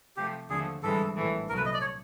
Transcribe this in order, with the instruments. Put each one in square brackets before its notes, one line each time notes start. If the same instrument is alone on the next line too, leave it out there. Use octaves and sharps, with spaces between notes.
[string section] C3 F3 A3 [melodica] G4
[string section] D#2 D3 F3 A3 [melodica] G#4
[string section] G#1 G2 E3 G#3 [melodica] A4
[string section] A#1 A2 E3 A3
[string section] C2 A#2 F#3 A3 [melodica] A#4
[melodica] B4
D#5
D5
C#5